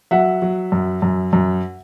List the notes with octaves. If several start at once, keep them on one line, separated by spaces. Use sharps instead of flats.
F#3 E5 F#5
F#3
F#2
F#2
F#2